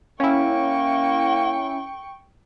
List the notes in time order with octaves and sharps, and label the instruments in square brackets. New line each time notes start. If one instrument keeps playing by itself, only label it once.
[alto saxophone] A#3 [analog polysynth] C#4 E4 [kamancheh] G5 C#6